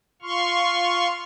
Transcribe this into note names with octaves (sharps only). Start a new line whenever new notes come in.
F4 C6 C#6 F6